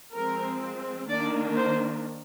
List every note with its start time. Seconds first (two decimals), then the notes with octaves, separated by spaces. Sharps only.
0.15 F3 G#3 C4 A#4
1.09 D#3 A#3 D4 D5
1.56 C5